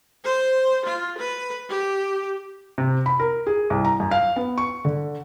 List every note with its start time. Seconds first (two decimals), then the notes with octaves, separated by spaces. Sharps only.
0.25 C5
0.86 F4
1.19 B4
1.69 G4
2.78 C3
3.06 B5
3.20 A#4
3.47 G#4
3.70 C2
3.85 A#5
4.00 F#2
4.11 F5
4.36 B3
4.58 C#6
4.85 D3